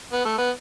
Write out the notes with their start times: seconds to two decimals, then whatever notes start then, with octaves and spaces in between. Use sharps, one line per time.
0.13 B3
0.25 A3
0.38 B3